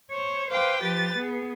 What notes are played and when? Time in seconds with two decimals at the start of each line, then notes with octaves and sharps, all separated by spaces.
0.11 C5 C#5
0.51 B4 C5 F5 G5 D6
0.83 F3 G4 B4 A6
1.17 B3 G#4